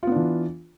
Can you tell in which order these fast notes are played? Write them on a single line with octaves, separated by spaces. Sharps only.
F4 B3 D4 E3